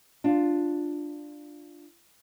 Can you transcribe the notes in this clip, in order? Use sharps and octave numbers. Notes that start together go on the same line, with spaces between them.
D4 F4